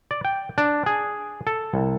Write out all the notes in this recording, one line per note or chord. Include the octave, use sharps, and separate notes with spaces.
D5
G5
D4
G#4
A4
C2